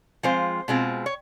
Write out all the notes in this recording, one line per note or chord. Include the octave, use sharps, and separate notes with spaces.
F3 G#3 C4 F4 C5
B2 G#3 C4 F4
C#5